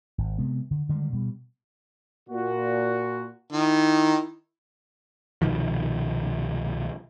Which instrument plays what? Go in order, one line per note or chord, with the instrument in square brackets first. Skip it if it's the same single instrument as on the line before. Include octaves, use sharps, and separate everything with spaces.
[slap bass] G#1
C3 G#3 B3
D3
D3 D#3 G3 G#3
B2 G3
[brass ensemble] A#2 F#4
[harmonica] D#3 [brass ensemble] E4
[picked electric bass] C2 B2 D#3 F3